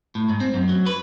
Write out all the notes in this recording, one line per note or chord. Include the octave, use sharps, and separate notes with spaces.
A2
G#2
C4
F#2
F#3
B4